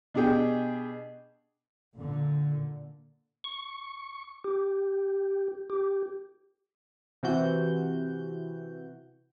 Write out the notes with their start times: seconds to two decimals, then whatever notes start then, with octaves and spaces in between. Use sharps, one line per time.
0.14 B2 D4 G4 G#4 G5
1.95 A#2 D3
3.44 C#6
4.44 G4
5.70 G4
7.23 C3 E3 F#4 G6